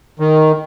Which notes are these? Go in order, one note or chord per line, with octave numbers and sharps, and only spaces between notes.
D#3